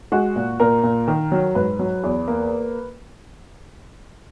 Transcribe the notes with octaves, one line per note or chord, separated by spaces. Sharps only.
G#3 F#4
A#2
A#2 A#4
A#2
D#3
F#3
G#2 B4
F#3
E2
A#3